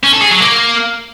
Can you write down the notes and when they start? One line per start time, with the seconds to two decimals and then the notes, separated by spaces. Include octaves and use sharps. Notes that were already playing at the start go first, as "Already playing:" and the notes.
0.03 C#4
0.13 A4
0.22 G#4
0.31 F#3
0.40 A#3